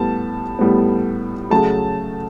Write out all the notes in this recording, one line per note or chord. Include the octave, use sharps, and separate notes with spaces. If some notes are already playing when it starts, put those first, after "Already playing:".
Already playing: A2 G3 B3 A5
A2 G3 B3
C#3 F#3 A3 A5